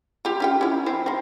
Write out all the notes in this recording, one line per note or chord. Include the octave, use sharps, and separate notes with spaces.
F4 G4
C#4 F4 G5
C#4 E4
F3 C4 E4
C4 D#4